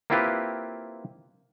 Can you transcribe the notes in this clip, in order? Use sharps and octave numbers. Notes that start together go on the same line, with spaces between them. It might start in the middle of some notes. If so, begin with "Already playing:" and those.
A#3 C4 E4 F4 G4 B4